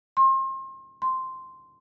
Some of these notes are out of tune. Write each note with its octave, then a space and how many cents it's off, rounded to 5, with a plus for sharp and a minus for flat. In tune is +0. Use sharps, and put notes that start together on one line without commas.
C6 +35
C6 -5